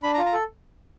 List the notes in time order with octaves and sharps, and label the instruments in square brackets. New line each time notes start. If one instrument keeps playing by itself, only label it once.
[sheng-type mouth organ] D4 B5
A#5
F4
A#5
A4